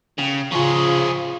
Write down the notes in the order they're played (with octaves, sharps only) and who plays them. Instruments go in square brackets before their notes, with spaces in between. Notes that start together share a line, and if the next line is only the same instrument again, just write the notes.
[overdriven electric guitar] C#3 [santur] G5
[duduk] C#3 [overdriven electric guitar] F3 G#4 [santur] F4 C#6